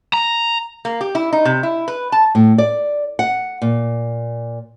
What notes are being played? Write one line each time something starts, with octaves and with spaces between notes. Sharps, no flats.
A#5
A#3
G4
E4
D#4
C3
E4
B4
A5
A2
D5
F#5
A#2